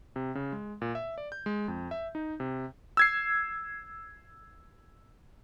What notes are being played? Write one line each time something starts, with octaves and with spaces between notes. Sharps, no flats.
C3
C#3
G#3
A#2
E5
D5
G6
G#3
F2
E5
D#4
C3
E6 G#6 C7